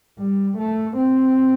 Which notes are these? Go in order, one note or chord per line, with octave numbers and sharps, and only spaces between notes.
G3
A3
C4